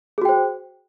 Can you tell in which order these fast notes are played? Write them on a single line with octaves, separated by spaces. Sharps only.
G#4 F#4 G5 C5